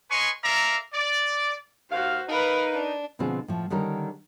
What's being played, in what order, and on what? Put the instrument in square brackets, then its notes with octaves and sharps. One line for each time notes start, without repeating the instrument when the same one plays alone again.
[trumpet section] B4 C#5 D#5 G#5 C6 C#6
A4 A#4 D5 E5 F5 A#5
D5
[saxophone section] D#2 F5 [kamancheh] F#4 C5
[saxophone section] D#4 [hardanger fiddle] A#4 B5 [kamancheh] B4 F5
[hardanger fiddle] D4
[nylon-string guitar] B2 D3 F3 C4 F4 G#4
A2 F3
D3 D#3 G3 C#4 A#4